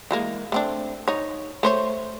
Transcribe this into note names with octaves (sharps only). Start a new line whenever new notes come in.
E3 G#3 A#3
A3 C4 D4
D#4 C#5
A3 C5 C#5